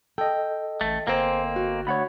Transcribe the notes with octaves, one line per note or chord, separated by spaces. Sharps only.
A4 D#5 G5
A1 A3
G1 A#3 C4 C5 F#5 G#5
F#4
D2 C#5 F#5 B5